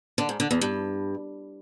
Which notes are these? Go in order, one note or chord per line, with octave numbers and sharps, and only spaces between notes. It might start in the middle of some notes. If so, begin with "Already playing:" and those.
D3
G#2
D3
E2
G2